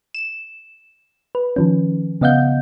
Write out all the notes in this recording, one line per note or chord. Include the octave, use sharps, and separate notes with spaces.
E7
B4
D#3 F3 C#4
C#3 B3 D#5 F5 F#5 G6